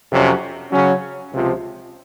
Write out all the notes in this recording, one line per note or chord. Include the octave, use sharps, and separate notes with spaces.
F2 C3 F#3 C#4
C#3 F#3 C#4
C#2 C3 F3